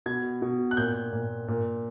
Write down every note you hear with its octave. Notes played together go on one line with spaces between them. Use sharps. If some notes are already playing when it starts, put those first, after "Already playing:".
B2 G#6
B2
F#6
A#2 G6
A#2
A#2